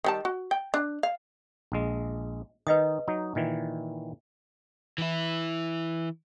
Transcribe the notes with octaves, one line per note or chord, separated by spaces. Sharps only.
D#3 G3 A5
F#4
G5
D4
F5
A#1 G#3
D#3 D#4 B4 D#5 D#6
F#3 D#4
A#2 D#3 E3
E3 E4